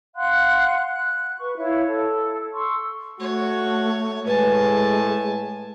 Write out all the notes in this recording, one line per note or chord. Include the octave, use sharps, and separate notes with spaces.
F5 F#5 C6 F#6
F#6
B4 C#6
E4 C#5 E5 F5
A4
C6 C#6 E6
A3 F#4 C#5
A2 G#3 B4 G#5 A5